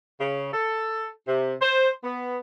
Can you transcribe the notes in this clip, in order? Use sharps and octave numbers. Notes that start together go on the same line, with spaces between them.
C#3
A4
C3
C5
B3